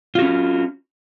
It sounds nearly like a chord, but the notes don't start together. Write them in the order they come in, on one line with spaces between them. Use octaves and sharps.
F4 F#4 C#4